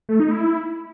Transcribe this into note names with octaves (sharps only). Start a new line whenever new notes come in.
A3
D#4
E4